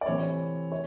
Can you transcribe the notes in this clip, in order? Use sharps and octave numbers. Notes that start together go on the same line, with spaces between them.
D5
C3 E3 A3 C4 C#5
C#5